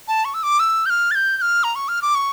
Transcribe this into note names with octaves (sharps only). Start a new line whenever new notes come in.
A5
C#6
E6
D6
E6
G6
F6
A6
G6
G6
F6
A#5
C#6
F6
D6
C#6